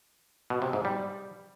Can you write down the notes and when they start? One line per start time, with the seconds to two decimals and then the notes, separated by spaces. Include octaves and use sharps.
0.50 B2
0.62 C3
0.73 G#2
0.85 G3